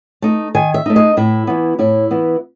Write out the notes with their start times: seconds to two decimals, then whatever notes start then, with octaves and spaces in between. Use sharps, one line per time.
0.22 A3 D#4
0.55 D#3 G#5
0.74 E5
0.86 A3 D#4
0.96 D#5
1.17 A2 E4
1.47 E3 B3
1.79 A2 E4
2.11 E3 B3